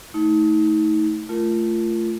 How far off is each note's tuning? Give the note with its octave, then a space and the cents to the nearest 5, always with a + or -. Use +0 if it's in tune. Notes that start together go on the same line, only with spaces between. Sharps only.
A3 +0 D#4 +35
A3 +5 F4 -25 A#4 +0